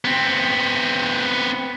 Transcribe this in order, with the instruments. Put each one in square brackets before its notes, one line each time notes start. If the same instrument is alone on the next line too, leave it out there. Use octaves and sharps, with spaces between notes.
[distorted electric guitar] B3 C4